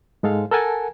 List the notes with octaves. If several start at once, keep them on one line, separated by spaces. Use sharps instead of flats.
G#2 G#3 A4 F5
A4 A#4 F#5 G#5 A5